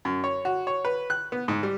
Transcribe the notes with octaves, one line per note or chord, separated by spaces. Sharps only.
F#2
C#5
F#4
C#5
B4
F#6
B3
G#2
G3